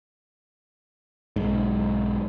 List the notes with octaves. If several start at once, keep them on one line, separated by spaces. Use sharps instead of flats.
B1 G#2